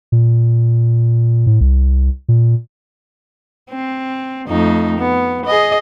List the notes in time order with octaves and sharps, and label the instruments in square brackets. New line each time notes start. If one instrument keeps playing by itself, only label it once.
[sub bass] A#2
A2
C2
A#2
[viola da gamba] C4
F2 A3 D#4
B3
G#4 D#5